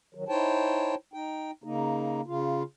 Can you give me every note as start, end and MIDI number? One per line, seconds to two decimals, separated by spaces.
0.15 0.24 51
0.15 0.24 54
0.29 0.95 63
0.29 0.95 64
0.29 0.95 72
0.29 0.95 73
0.29 0.95 79
0.29 0.95 81
1.14 1.51 63
1.14 1.51 79
1.64 2.21 49
1.64 2.21 58
1.64 2.21 63
2.27 2.63 49
2.27 2.63 65